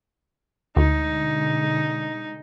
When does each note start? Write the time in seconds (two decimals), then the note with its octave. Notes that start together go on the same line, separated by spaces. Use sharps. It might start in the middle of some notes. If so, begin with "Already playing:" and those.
0.77 D2 B2 D3 G#3 D#4